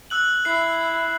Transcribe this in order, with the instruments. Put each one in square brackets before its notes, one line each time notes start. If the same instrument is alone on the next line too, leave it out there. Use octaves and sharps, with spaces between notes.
[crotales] E6 F#6 F#7
[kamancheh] E4 [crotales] C7